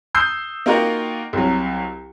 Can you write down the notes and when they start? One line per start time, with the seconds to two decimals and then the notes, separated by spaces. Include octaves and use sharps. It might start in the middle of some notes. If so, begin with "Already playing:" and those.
0.15 D#6 E6 G6 C7
0.66 A#3 D#4 F4 F#4 A#4 G5
1.33 C2 F#3